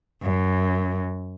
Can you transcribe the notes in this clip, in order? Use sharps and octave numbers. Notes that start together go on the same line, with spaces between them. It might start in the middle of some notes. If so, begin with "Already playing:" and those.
F#2